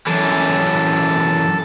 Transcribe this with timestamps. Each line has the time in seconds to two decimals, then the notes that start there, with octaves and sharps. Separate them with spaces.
0.07 F#2 E3 A4